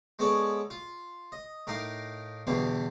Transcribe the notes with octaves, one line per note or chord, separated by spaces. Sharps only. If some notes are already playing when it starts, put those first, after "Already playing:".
G#3 B3 A4 C#5 D5
F4
D#5
A2 D#4 A#4 F5 D6
E2 B2 D3 G3 F5